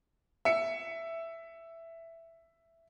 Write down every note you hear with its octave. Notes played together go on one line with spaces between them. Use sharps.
E5 C#7